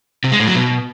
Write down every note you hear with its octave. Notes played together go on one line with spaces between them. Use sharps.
C3
G#3
A2
F#3
B2